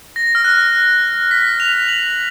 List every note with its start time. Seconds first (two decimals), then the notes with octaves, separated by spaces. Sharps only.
0.16 A#6
0.35 F6
0.44 F#6
1.31 B6
1.60 F7
1.89 F#7